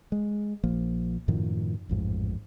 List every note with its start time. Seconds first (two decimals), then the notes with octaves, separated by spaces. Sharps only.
0.12 G#3
0.63 A#1 F3 A#3
1.28 F#2 A2 D#3 F3
1.89 A1 F2 G#2